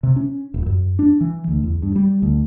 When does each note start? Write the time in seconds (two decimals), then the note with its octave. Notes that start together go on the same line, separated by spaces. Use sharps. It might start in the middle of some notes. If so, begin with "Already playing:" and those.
0.03 C3
0.16 C#4
0.54 D#1
0.66 F#2
0.99 D4
1.21 E3
1.48 D2
1.64 E2
1.82 G2
1.96 G3
2.22 D2